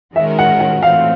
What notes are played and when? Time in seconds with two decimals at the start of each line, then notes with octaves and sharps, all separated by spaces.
0.16 D#3 G#3 C#4 F#4 A#4 E5
0.39 F#5
0.60 F#5
0.83 E3 A3 C4 F5